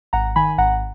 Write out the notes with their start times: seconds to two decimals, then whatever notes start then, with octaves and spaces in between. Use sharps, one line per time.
0.13 G#1 F#5 A#5
0.36 D#3 G#5 B5
0.58 G#1 F#5 A#5